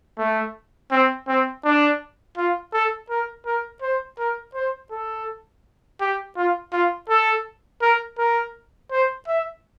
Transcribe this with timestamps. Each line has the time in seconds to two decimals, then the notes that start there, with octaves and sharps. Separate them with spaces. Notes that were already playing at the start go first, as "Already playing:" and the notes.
0.18 A3
0.91 C4
1.28 C4
1.64 D4
2.37 F4
2.73 A4
3.10 A#4
3.46 A#4
3.82 C5
4.19 A#4
4.54 C5
4.91 A4
6.00 G4
6.36 F4
6.73 F4
7.09 A4
7.82 A#4
8.18 A#4
8.91 C5
9.28 E5